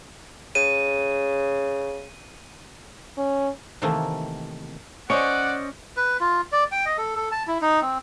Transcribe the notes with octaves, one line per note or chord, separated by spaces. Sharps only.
C#3 D#7
C#4
C3 D#3 E3 A3 A#3
C#4 C5 D5 D#5 F#5 C#7
B4
F4
D5
G5
D#5
A4
A4
A5
E4
D#4
C4